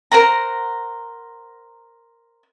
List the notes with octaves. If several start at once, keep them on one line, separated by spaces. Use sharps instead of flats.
A#4 C5 F#5 A#5